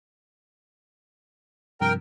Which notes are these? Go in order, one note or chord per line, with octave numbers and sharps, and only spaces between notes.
G2 C3 F3 A#4 G5